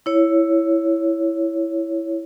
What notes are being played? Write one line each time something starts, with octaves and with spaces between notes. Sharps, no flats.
E4 C#5